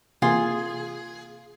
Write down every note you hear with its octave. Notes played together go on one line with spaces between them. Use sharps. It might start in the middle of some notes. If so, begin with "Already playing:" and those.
C3 E3 A#3 F4 G#4